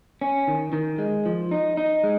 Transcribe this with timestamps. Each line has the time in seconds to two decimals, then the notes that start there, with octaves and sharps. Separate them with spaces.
0.21 C#4
0.48 D#3
0.73 D#3
0.99 G#3
1.26 F3
1.51 D#4
1.77 D#4
2.04 G#3